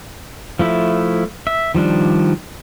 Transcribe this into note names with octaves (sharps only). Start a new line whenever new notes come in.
F3 A3 E4
E5
D#3 F3 G3 D4